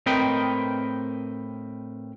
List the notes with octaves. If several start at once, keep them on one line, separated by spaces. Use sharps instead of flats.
A2 C4 A#4 B4 D#5 G5